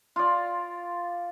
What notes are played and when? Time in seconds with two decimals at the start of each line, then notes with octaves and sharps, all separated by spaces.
0.16 F4 D5